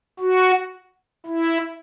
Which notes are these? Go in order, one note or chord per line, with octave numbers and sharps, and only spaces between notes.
F#4
E4